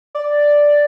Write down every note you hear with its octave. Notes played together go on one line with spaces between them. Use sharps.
D5